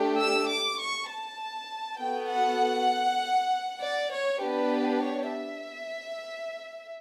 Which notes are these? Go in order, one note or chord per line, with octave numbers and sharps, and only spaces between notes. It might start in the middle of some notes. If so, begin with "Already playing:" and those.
Already playing: A3 D4 G4
E6
D6
C#6
A5
B3 F#4 A4 G5
F#5
D5
C#5
B3 D4 G4 B4
C#5
E5